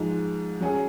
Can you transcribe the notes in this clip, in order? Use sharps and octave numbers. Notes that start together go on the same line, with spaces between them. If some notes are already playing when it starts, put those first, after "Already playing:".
Already playing: G#2 F3 G#3 D#4
F#3 C#4 G#4